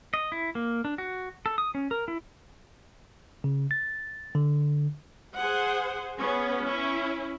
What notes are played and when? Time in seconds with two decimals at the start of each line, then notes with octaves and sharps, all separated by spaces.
0.14 D#5
0.32 E4
0.55 A#3
0.85 D4
0.98 F#4
1.46 A4
1.58 D#6
1.75 C#4
1.91 A#4
2.08 E4
3.44 C#3
3.71 A6
4.35 D3
5.37 G#4 C5 F#5
6.18 B3 C#4 G#4
6.65 C#4 E4